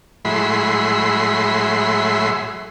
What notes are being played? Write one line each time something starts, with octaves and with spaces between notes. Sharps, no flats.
A2 F#3 G#3 E4 B5 C6